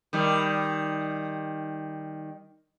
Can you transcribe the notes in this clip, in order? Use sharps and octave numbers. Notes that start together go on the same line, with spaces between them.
D#3 G3